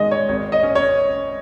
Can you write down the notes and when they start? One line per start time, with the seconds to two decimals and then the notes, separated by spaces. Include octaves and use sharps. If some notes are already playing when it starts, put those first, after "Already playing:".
Already playing: D#3 G#3 D#5
0.11 C#5
0.29 G#1 C#5
0.52 D#5
0.63 C#4
0.75 C#5